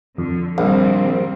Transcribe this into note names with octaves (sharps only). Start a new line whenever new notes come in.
F2 D3
A#1 D#3 G3 C4